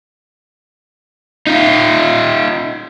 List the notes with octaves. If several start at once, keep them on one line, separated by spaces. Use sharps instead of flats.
D#4 F4